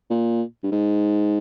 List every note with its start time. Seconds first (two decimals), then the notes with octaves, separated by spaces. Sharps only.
0.10 A#2
0.63 G2
0.72 G#2